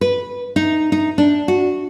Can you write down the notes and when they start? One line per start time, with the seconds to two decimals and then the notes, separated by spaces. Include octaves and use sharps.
0.01 B4
0.56 D#4
0.92 D#4
1.18 D4
1.48 F#4